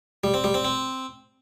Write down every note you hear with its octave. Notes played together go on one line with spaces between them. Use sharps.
G3
C4
G3
C4
C4